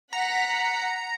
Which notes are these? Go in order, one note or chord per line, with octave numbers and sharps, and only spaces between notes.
F#5 A#5 B6